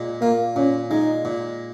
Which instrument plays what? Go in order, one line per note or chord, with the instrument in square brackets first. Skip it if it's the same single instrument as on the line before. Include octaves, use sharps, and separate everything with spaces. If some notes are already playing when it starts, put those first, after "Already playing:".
Already playing: [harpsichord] A#2 G#3
[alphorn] A#3 [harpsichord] F4
[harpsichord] A#2 [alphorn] C#4
[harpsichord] G#3 [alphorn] D#4
[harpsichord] A#2